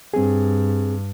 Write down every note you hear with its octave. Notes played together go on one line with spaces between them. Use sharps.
G2 C4 G#4